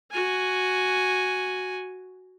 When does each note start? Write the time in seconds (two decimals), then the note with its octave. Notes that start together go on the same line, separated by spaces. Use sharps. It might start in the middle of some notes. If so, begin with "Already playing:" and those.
0.12 F#4 G#5